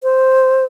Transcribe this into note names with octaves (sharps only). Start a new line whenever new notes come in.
C5